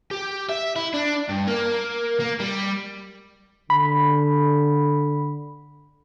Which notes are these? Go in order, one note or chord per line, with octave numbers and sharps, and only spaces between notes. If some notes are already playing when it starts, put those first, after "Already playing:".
G4
E5
E4
D4
G2
A#3
A#3
G3
D3 B5